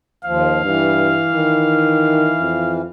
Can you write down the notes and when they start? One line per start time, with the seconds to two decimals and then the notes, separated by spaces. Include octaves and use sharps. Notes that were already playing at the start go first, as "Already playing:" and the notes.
0.24 D#2 F3 F5
0.64 G2 E3
1.35 D#3
2.40 F2